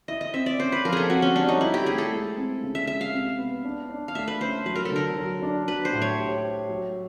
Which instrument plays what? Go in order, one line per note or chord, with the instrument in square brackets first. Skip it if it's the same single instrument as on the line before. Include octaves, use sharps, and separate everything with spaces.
[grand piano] E4 [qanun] D#5
[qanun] D#5
[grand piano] C4 [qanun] E5
[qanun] D5
[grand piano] C#4 [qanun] C5
[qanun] B4
[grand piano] F3 [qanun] A#4
[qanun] G#4 A4
[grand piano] C4 [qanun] F#4
[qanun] C#4
[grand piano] G3 [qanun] D4
[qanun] D#4
[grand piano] C4 [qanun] E4
[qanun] G4
[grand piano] A3 [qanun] G#4
[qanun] A4
[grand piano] G#3
C4
C#3
[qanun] E5
[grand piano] G#3 [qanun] E5
[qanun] F5
[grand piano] C3
B3
D4
D4
[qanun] F5
[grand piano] A3 [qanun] E5
[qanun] B4
[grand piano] C#4 [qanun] C5
[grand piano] F#3 [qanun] B4
[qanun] A#4
A4
[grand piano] D3 [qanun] A#4
[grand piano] F#3
D4
[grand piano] F#3 [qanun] B4
[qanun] C5
[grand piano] A2
[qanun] C#5
[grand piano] G4
C5
F#3